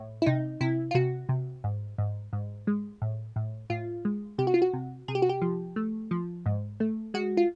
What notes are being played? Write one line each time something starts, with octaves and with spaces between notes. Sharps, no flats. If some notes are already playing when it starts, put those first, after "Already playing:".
Already playing: A2
E4
C3 D#4
C3 E4
F4
C3 F#4
C3
G#2
G#2
G#2
G#3
A2
A2
A2 F4
G#3
C3 G4
F#4
F4
F#4
C3
C3 G#4
G4
F#4
G4
F3
A3
F3
G#2
A3
G#3 F#4
F4